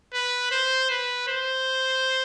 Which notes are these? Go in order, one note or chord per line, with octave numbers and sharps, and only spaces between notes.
B4
C5
B4
C5